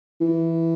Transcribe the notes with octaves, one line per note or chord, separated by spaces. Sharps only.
E3